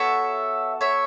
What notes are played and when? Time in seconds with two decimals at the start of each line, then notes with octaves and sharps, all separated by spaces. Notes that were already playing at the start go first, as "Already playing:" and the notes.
Already playing: B3 F#4 A4 C#5 E5
0.81 C#5 E5